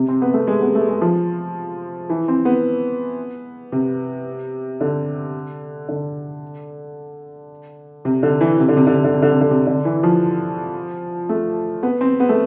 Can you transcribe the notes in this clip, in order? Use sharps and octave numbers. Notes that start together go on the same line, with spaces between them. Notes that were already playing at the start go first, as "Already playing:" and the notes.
Already playing: C3
C4
B3
A3
G#3
B3
A3
G#3
F3
E3
C4
B3
C3
D3
D3
C3
D3
E3
C3
D3
C3
D3
C3
D3
C3
D3
C3
D3
C3
D3
E3
F3
A3
B3
C4
B3
A3